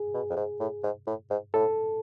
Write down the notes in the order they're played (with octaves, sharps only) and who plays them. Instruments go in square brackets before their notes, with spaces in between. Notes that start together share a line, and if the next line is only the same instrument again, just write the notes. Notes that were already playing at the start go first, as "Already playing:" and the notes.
Already playing: [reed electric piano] G#4
[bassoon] B2
F2
G#2
A2
G#2
A2
G#2
[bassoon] A2 [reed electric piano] A4